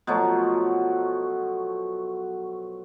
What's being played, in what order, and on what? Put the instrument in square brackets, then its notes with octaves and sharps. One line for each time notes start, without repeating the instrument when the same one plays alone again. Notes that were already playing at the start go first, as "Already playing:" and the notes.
[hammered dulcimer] B2 F3 F#3 A3